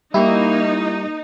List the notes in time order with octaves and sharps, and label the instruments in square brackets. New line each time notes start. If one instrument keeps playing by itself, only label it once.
[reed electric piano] G3 G4 C#6 [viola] A#3 [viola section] D#4 [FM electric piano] E4